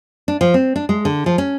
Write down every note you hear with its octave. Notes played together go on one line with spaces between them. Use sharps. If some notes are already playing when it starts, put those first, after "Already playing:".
D4
F3
C4
D4
G#3
D3
F3
C#4